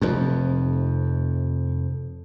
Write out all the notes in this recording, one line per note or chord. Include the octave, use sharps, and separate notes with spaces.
F1 F2